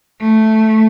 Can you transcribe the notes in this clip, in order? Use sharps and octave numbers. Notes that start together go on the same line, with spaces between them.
A3